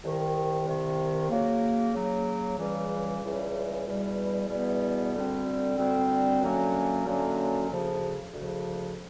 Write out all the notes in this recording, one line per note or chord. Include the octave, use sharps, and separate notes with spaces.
C2 C3 D#3
C2 C3 D#3
C#3 F#3 A#3
C#3 F#3 A#3
C#2 C#3 E3 G3
C#2 C#3 E3 G3
E2 B2 G3 B3
E2 B2 G3 B3
D2 D3 G3 C4
D2 D3 G3 C4
F#2 D3 F#3 A#3 C#4
F#2 D3 F#3 A#3 C#4
D2 C#3 F3
D2 C#3 F3